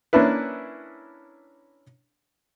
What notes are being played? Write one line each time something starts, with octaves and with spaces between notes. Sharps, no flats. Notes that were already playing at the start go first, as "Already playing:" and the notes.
A#3 C#4 D4 E4 B4